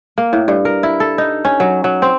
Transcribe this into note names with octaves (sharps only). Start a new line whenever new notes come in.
A#3
A2
G2
A#4
E4
A4
D#4
C#4
F#3
F#3
C4